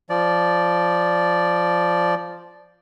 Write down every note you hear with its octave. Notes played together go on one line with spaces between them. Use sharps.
F3 D5